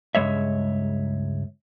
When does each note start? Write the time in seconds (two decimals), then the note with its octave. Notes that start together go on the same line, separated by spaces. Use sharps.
0.15 C#2 G2 C3 G#3 C#5 E5